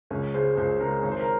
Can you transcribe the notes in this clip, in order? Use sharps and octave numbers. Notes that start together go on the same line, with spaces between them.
C#2 C#4
C#3 G#3 C5
C#2 C5
C#3 G#3 A#4
G#1 C#5
C5
A#4